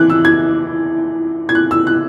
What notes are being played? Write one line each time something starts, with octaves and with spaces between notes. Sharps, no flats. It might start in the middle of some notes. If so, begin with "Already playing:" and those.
Already playing: E3 F#6 G#6
E6
G#6
G#6
F#6
E6
F#6